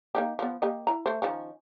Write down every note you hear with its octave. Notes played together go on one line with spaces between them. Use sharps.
A#3 D#4 G4
F3 B3
A#3 G4 D#5
E4 A#5
A3 C5
D#3 F3 C#4